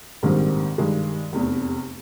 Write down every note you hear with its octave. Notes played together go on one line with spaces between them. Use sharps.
A#1 G#2 D#3 G3 C4
G2 D#3 G#3
F1 E2 C3